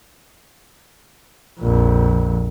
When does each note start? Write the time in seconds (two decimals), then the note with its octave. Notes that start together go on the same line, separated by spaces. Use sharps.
1.61 A#1 F2